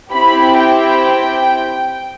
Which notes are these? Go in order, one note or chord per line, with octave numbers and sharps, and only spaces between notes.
C4 E4 G4 B5
G5